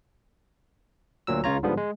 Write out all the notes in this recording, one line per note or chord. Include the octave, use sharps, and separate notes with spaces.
D2 A#2 F#3 E6
C#2 C#3 F4 C#5 A#5
G#2 D3 F3 G3 B3
G#3